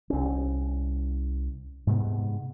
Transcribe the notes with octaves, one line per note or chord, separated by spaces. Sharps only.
C2 C#4
G#2 C3 G#3 B3